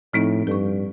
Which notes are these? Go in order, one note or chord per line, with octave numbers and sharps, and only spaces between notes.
A2 F3 C4 D#4
G2 A4 C#6